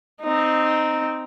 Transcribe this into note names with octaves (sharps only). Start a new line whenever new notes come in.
C4 D#4